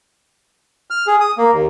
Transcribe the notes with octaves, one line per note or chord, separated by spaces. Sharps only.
F6
G#4
D#6
A#3
D#2